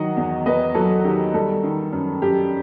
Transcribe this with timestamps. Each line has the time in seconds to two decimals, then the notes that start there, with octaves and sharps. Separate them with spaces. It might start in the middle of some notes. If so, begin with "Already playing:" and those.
Already playing: D#3 F#3 D#5 F#5
0.17 E2
0.46 E2 B4 D#5
0.74 F#3 A4
1.04 D#3 G4
1.34 G3 A4
1.64 D#3
1.92 F#2
2.22 F#2 G4